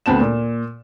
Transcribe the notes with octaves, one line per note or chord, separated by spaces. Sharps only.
D2 B3 C4 A5 E7
A#2